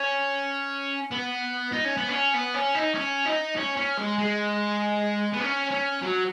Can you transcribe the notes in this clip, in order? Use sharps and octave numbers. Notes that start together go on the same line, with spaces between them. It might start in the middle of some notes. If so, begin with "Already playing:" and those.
Already playing: C#4
B3
D#4
C#4
B3
C#4
B3
C#4
D#4
C#4
D#4
C#4
C#4
G#3
G#3
B3
C#4
C#4
F#3